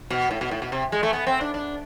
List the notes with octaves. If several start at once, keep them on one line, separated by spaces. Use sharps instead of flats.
B2
A2
B2
A2
B2
C3
G#3
A3
B3
C4
D4
D4